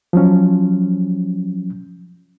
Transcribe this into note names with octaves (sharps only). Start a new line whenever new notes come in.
F3 F#3 C#4